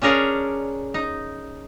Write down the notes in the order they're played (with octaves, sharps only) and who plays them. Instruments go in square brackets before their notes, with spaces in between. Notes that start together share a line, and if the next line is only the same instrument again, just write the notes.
[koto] C#4 D4 G#4 A#4 C#5 D5
D#4